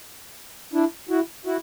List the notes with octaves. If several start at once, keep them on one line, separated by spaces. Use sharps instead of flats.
D4 E4
E4 F#4
E4 F#4